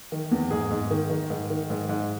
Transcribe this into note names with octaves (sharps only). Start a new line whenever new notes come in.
D#3
E2
G#2 G#4
G#2
D#3
D#3
G#2
D#3
G#2
G#2